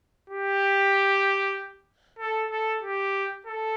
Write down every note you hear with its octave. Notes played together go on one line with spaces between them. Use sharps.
G4
A4
A4
G4
A4